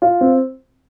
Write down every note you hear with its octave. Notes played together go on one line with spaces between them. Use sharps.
F4
C4